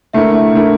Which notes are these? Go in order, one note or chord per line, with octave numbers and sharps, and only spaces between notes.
D3 A3 E4 A#4 E5
D3 A3 E4 A#4